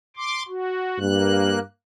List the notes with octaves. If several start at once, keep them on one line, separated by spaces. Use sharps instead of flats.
C6 D6
F#4
G2 A#3 F#6